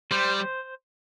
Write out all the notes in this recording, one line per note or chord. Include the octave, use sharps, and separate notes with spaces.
G3 C5